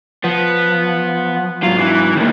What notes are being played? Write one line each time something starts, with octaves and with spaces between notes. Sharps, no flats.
F3 B3
G#2 F#3 F4
E3
C#2 A2 D#3 A#3